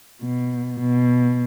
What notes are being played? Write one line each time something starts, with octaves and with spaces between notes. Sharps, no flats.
B2
B2